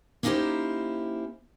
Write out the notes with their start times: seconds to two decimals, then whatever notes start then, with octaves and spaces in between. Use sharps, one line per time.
0.23 A#3 C#4 D#4 E4 G4 C5